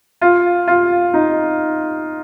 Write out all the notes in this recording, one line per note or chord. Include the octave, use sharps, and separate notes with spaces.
F4
F4
D#4